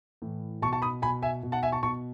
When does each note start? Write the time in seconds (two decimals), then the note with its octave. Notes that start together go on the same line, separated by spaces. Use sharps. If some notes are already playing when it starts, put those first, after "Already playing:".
0.22 A2 E3
0.62 B2 A5 C#6
0.72 A5 C#6
0.82 B5 D#6
1.02 B2 G#5 B5
1.22 E5 G#5
1.43 B2
1.52 F#5 A5
1.63 E5 G#5
1.72 A5 C#6
1.83 B2 A5 C#6